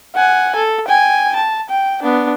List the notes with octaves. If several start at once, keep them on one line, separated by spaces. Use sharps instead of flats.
F#5 G#5
A4
G5 G#5
A5
G5
B3 D4